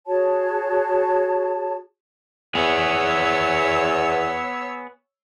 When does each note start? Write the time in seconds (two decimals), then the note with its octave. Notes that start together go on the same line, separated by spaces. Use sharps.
0.07 F#4 G#4 C#5 A5
2.55 E2 B3 G#4 C#5 E6